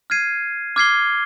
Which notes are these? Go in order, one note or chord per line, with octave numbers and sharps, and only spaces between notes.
F6 G#6 C7 D#7
D6 F6 G#6 C7 G7